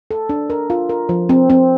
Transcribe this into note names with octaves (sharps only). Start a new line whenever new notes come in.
A4
D4
A#4
F4
A#4
F3
C4
C4